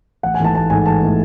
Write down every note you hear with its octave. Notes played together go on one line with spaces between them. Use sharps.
A1 F#5
G#5
G#2 E3 A3 A5
A1 A5
G#2 E3 A3 G#5
A1 A5
E3 A3